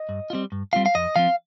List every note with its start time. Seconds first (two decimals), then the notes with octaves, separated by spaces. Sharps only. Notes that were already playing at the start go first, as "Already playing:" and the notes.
Already playing: D#5
0.09 G2
0.30 F4
0.33 G3 C4
0.52 G2
0.73 G3 C4 F4 F5
0.86 F5
0.95 F2 D#5
1.16 F3 C4 F5